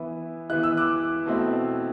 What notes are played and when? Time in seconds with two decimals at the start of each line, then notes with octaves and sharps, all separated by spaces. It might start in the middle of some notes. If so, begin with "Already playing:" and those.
Already playing: E3 B3 E4
0.50 E3 B3 E4 F#6
0.63 E6
0.77 D6 F#6
1.26 B2 A3 C4 E4